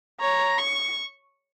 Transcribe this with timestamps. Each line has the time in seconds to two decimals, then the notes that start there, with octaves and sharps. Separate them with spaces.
0.20 C#5 A#5
0.58 C#6